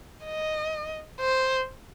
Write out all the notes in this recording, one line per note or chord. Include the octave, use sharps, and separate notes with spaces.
D#5
C5